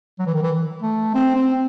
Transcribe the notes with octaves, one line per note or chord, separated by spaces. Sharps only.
F#3
E3
D#3
E3
A3
C4
C4